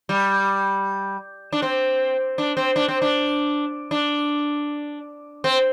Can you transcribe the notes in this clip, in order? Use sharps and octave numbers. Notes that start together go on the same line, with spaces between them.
G3
D4
C4
D4
C4
D4
C4
D4
D4
C4